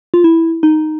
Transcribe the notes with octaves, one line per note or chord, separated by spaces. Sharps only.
F4
E4
D#4